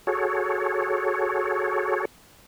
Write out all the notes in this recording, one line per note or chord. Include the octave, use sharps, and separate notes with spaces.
F#4 G#4 A4 C#5